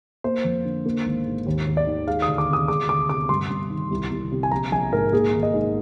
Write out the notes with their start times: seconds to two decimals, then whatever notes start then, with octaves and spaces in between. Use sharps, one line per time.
0.24 A#3 C5
0.44 F2
0.65 D3
0.86 A#3
1.06 G#1
1.26 G#2
1.46 D#2
1.67 D#2
1.77 D5
1.87 D#3
2.07 G#3 F5
2.22 D#6
2.28 D2
2.38 D6
2.48 C3
2.53 D#6
2.68 G#3 D6
2.89 D2 D6
3.09 C3 D6
3.29 G2 C6
3.50 G2
3.70 D#3
3.91 C2
4.11 C2
4.32 C3
4.43 G#5
4.52 A#1 A#5
4.72 A#1 G#5
4.92 G#2 A#4
5.13 A#3 G#4
5.33 G#1
5.43 D#5
5.54 G#2